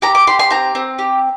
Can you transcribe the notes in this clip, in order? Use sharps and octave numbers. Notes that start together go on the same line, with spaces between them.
G4 A#5
D6
G4 C6
C6
C4 A#5
C4
G4